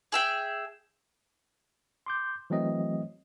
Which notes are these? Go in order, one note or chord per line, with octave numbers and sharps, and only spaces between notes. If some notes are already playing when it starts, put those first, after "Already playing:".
G#4 E5 G5
C6 D6 G6
E3 F#3 A3 C4 D#5